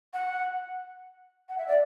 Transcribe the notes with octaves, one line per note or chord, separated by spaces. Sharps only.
F#5
F#5
E5
D5